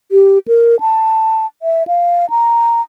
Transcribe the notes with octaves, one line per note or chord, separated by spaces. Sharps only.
G4
A#4
A5
E5
F5
A#5